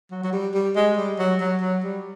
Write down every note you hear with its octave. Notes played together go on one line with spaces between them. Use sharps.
F#3
F#3
G3
G3
G#3
G3
F#3
F#3
F#3
G3